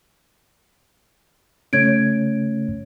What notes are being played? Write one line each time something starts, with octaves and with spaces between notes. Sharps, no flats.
C#3 A3 C#4 C#5 G#6 D7